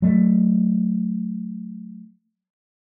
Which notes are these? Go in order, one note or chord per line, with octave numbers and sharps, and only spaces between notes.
F#3 A3